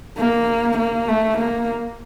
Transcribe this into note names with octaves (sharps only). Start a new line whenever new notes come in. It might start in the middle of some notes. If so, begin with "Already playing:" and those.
A#3
A#3
A3
A#3